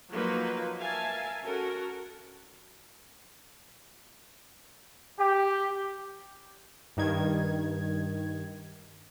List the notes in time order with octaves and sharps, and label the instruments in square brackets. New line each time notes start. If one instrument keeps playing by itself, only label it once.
[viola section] F3 F#3 A#3 D#4 F#4 B4
A#4 E5 F5 G#5 A5
C#4 F#4 A4 A#4
[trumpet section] G4
[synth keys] G2 D#3 G#6